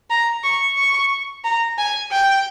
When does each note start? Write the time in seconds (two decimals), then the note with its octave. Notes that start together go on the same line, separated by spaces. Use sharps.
0.10 A#5
0.44 C#6
0.77 C#6
1.45 A#5
1.78 G#5
2.12 G5